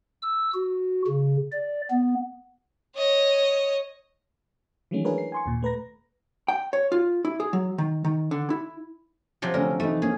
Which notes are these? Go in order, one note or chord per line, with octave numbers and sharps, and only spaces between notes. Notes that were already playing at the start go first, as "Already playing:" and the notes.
E6
F#4
C#3
D5
B3
C#5 D#5
D#3 E3 F#3 G#3 A3 C#4
D4 E4 G#4 A#4 B4 C#5
C7
G#5 C6 C#6
D#2 A#2
A3 B4 A#5 A#6
G5
C#5
F4
E4
G#4
F#3
D#3
D#3
D3
E4
C3 F3 F#3
D3 A3 C#4 A#4
E3 A3 D#4
A#3 C#4 G#4